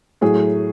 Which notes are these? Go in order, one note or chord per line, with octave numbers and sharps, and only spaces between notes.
A2 F#3 G#4